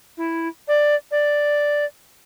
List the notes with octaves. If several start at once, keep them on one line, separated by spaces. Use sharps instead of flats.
E4
D5
D5